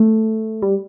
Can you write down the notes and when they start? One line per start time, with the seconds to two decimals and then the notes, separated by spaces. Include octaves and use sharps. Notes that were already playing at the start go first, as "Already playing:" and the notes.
Already playing: A3
0.62 G3